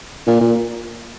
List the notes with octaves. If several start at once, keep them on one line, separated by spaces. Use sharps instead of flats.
A#2
A#2